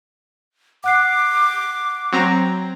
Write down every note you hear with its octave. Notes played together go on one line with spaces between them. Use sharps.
F#5 D6 F#6 C7
F#3 C4 A#5